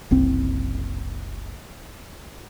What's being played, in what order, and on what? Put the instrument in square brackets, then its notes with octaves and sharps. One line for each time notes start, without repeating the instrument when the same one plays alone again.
[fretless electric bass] F#1 C2 C4